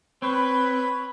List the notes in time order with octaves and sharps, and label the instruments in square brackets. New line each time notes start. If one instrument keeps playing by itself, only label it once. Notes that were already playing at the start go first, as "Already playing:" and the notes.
[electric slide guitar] C4 [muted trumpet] B4 [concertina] C#5 [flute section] B5